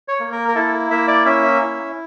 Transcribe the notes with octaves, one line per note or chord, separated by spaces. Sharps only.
C#5
A#3
A#4
A#4
E4 A4
A#3 E5
D5
C#4 E5
E4